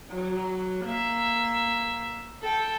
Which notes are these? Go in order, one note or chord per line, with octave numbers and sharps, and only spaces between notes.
F#3
A#3 E5
A4 G5